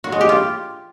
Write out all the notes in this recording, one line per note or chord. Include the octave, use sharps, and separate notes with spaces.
F#4
G#3
G4
F4